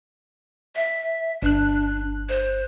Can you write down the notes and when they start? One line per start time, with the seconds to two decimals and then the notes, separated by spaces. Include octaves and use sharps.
0.76 E5
1.42 G1 D4 F#6
2.29 C5